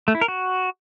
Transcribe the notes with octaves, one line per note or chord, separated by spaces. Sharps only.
A3
E4
A#4
F#4